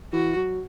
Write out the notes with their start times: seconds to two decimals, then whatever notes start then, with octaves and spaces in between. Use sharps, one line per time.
0.13 E3 F#4
0.36 F#3